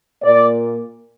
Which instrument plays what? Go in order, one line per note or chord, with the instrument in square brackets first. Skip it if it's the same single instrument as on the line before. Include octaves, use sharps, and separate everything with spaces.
[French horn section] A#2 A#3 D5